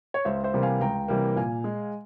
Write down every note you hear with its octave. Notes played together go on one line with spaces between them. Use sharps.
C#5
C#2 C5 E5
C5 E5
C3 E3 G3 A#3
F5 G#5
C#2 G5 A#5
C3 E3 G3 A#3
A#2 F5 G#5
G#3